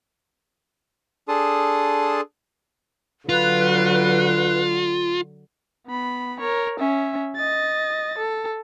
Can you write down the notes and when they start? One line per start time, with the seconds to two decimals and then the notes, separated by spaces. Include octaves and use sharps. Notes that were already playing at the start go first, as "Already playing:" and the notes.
1.28 D4 G#4 A4 A5 C6 D#6
3.29 D3 F#3 F4 B4 F#6
5.87 B3 B5
6.40 A#4 C#5
6.80 C#4 E5
7.36 D#5 A6
8.18 A4